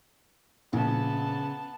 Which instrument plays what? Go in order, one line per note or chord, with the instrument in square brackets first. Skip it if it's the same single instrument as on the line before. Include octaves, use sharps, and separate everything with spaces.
[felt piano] A#1 [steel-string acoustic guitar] C#3 [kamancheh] B3 A5